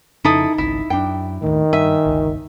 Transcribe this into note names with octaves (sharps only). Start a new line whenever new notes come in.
F2 C#3 D#4 E4 A4 D#6
G#1 C#2 E4
F#2 D4 G5
D#2 A2 D#3
G2 E5 G#5
G1 C#2